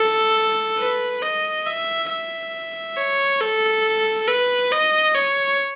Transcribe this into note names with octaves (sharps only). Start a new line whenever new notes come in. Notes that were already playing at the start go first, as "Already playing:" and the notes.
Already playing: A4
B4
D#5
E5
E5
C#5
A4
B4
D#5
C#5